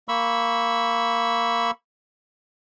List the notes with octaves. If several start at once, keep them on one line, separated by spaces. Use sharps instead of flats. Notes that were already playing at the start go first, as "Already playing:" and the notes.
A#3 B5 C#6 E6